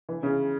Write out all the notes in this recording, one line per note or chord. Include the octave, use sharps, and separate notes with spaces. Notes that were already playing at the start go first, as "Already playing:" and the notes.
E3
C#3